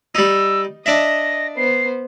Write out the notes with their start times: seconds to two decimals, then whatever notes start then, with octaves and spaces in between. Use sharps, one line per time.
0.15 G3 D#4 E6
0.86 D4 D#5 E5 A#6
1.57 B3 C5 C7